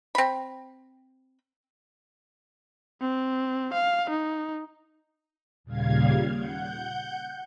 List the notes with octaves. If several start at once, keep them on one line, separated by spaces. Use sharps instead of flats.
C4 B5
C4
F5
D#4
D#2 A#2 C#3 G3 F5 G#6
F#5 G6